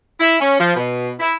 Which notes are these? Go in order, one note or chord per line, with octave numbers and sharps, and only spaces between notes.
E4
C#4
F3
B2
E4